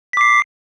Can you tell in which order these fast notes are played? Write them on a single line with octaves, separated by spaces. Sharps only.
B6 D6 C7